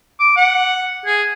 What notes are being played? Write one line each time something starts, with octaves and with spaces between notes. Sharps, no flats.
D6
F#5
G#4